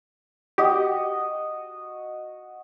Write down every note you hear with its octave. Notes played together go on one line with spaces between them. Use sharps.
F#4 G4 D#5